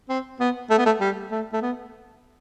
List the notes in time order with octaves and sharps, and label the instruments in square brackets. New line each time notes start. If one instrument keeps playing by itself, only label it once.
[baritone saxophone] C4
B3
A3
B3
A3
G3
A3
A3
B3